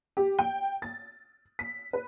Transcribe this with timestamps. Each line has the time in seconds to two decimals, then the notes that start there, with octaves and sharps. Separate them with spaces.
0.17 G4
0.39 G5
0.82 A6
1.59 B6
1.93 B4